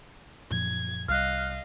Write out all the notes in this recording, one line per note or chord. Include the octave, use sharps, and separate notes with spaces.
F#2 A#2 F3 G#6
C2 G3 D#5 F5 F6 F#6